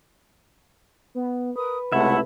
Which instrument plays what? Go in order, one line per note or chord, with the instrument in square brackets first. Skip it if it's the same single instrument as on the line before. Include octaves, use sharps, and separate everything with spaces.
[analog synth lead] B3
[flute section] A#4 D#6 [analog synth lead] B4
[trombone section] C#2 C3 A3 [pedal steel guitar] E4 E5 [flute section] F#5